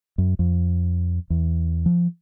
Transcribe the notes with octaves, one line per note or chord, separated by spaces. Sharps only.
F#2
F2
E2
F3